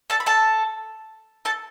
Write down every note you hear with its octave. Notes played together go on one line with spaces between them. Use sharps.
A4 A5
B5
A4 A5
A4 A5